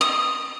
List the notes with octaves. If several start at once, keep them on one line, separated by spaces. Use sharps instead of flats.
D#6